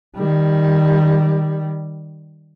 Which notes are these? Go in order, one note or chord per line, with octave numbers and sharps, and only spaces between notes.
D#3 G3